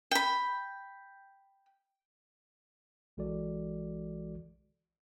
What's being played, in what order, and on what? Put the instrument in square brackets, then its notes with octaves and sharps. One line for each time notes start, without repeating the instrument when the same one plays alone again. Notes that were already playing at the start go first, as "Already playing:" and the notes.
[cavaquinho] G5 B5
[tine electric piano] A#1 E3 G#3 F#4 A4 D5